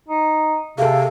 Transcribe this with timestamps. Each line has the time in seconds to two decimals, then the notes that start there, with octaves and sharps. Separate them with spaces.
0.08 D#4
0.78 C3 G#4 A4 F5